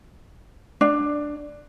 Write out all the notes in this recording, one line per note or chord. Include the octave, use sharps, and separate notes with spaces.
D4